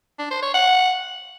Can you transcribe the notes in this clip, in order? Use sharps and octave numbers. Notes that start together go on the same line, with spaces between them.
D4
C5
C#5
F#5